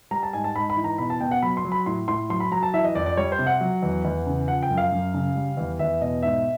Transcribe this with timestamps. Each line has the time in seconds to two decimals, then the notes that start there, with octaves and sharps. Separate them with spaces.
0.11 G3 A#5
0.23 A5
0.33 G#2 G#5
0.44 A5
0.55 G#2 B5
0.70 B5
0.77 E3
0.84 A#5
0.98 B2 B5
1.10 A5
1.20 B2 G5
1.31 F#5
1.42 F#3 B5
1.57 C6
1.65 F#3
1.72 B5
1.86 A2 C6
2.08 A2 C6
2.30 F#3 C6
2.40 B5
2.52 F#3 A#5
2.63 A5
2.74 E3 E5
2.84 D#5
2.95 F2 D5
3.06 D5
3.17 G3 C#5
3.32 C5
3.39 C3
3.47 F#5
3.61 F#3
3.83 E2
4.05 E2
4.26 C#3
4.48 F3 F#5
4.63 G5
4.70 F#2
4.78 F5
4.92 F#2
5.14 C#3
5.35 G3
5.57 E2
5.79 E2 E5
6.01 B2 D#5
6.22 G#2 E5